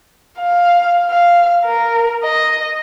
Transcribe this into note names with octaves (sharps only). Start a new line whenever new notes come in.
F5
F5
A#4
D#5